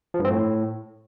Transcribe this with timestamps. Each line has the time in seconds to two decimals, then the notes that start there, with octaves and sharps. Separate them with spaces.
0.14 F3
0.19 G2
0.25 C4
0.30 A2